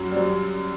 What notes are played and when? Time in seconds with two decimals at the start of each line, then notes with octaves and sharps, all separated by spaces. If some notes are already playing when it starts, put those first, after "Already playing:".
Already playing: F#2 F#3
0.11 G3
0.16 F#3